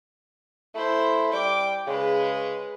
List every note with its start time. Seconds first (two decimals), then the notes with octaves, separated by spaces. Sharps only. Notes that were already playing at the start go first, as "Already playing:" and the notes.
0.75 A3 E4 C5
1.32 G3 G5 D6
1.87 C#3 G#3 B4